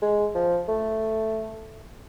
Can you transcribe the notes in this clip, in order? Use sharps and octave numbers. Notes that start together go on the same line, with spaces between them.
G#3
F3
A3